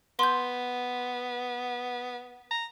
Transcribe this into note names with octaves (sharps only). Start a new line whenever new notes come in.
B3 C6 G6
A#5